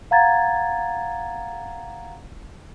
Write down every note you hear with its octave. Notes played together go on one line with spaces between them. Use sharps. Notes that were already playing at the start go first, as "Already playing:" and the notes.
F5 F#5 A#5 G#6 A6